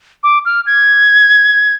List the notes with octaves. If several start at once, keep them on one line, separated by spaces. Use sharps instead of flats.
D6
F6
G#6